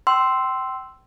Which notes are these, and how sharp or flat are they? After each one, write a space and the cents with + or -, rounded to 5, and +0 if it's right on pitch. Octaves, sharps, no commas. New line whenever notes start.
G5 -30 C6 +0 E6 +0